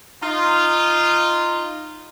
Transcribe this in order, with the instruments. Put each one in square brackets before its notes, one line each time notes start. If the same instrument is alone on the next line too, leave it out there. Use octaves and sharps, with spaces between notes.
[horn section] D#4 F4